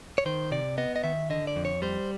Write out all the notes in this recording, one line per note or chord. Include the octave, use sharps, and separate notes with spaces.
C#5
D#3 C5
C3 D5
B3 D#5
D#5
D#3 E5
D3 D#5
D5
F2
C#5
G3 C5